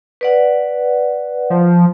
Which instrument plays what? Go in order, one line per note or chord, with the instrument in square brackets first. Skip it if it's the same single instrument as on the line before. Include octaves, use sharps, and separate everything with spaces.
[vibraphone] B4 D5 F#5
[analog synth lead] F3